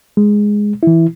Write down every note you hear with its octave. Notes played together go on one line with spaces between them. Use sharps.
G#3
E3 E4